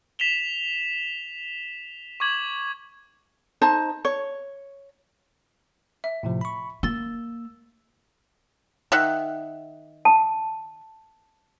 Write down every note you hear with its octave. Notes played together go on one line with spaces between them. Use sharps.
B6 E7 F7 G7
C#6 D6 G#6 F#7
D#4 C5 A5
C#5
E5
A2 C3 F3
B5 C#6
A#3 E6 A6 G7
D#3 E5 F#5
A5